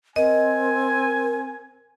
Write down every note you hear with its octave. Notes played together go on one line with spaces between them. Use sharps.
C4 A#4 D#5 G#5